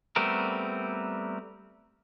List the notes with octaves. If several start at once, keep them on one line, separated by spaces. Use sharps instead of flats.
G3 A3 B3 C4 A#4